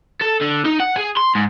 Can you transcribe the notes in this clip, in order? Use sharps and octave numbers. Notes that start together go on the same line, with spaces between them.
A4
D3
D#4
F#5
G#4
C6
G#2